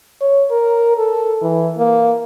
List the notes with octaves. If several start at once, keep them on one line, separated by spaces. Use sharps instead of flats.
C#5
A#4
A4
E3
A#3